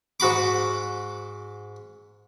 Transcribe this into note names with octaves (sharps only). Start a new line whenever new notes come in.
G#2 F#4 B5 D6